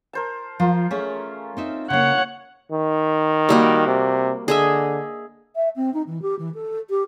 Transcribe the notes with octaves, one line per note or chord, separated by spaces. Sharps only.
A#4 C5 A5
F3 F4 A#4
A3 C#4 G#4 E5
C4 D#4 E5
C#3 A#3 C#5 F#5
D#3
G3 A#3 F#4
C3
D3 G#4 D#5 E5
E5
C4
D#4
E3
G4
E3
A4
G4